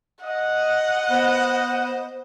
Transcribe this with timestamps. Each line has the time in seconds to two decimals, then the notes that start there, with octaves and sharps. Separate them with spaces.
0.24 D#5 F#5
1.10 B3 C5